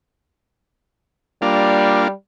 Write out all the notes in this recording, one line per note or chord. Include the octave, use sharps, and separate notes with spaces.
G3 A#3 D4 F4